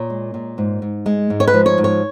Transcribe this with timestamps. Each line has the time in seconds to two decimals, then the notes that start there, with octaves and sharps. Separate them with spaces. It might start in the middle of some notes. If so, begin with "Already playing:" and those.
Already playing: A#2 C#5
0.10 G#3
0.34 A#2
0.58 G#2
0.82 G#2
1.06 G#3
1.30 G#2
1.40 C#5
1.48 B4
1.54 F3
1.66 C#5
1.78 G#2
1.84 C#5